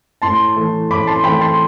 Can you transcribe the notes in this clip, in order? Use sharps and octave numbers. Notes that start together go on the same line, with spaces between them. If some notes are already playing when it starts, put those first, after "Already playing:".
A2 A5 C6
E3 A3
A2 B5 D6
A5 C6
E3 A3 G5 B5
A5 C6